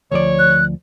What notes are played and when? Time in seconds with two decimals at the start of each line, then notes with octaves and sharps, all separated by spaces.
0.11 D2 F3 C#5 D5
0.39 F#6